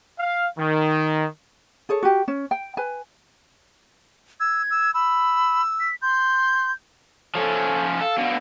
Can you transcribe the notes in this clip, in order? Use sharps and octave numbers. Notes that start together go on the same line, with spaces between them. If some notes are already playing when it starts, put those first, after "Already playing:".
F5
D#3
G#4 A4 C#5
F#4 G4
C#4
G5
B4 G#5
E6 G#6
E6
B5 E6
B6
C6 G6
F3 C#4 A4
A4 F5
B2 D3